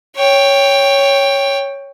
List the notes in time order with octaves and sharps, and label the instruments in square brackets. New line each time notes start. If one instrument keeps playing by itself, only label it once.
[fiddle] C#5 G5